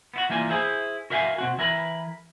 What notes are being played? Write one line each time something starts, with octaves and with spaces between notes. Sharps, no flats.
B3 E4 F#4
E3 G3 A#3 F4 G#5
E4 G#4 C5 E5
F#4 A#4 E5 F5 G5 G#5
B2 C4 F#4
E3 E4 A#4 B4 B5